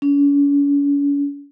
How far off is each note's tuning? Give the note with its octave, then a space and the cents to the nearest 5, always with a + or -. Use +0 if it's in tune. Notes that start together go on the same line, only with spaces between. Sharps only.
C#4 +40